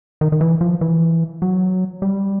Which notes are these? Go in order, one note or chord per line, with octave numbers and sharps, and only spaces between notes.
D#3
D#3
E3
F3
E3
F#3
G3